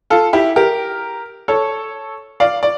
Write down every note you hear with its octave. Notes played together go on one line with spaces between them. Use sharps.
F4 A4
E4 G4
G4 A#4
A4 C#5
D5 F5
D5